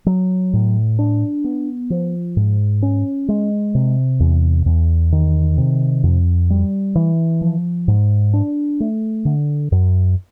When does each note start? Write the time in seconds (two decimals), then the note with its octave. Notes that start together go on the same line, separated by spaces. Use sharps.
0.06 F#3
0.53 A2
0.99 D4
1.44 B3
1.90 F3
2.37 G#2
2.83 C#4
3.29 G#3
3.75 C3
4.20 E2
4.66 E2
5.12 D#3
5.58 C3
6.04 F2
6.50 G3
6.95 E3
7.41 F3
7.88 G#2
8.33 D4
8.80 A3
9.25 D3
9.72 F#2